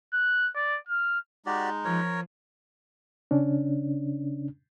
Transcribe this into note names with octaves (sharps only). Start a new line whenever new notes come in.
F#6
D5
F6
G#3 D#4 F#4 G4 D5
F3 A#4 C#5
C#3 C#4 D4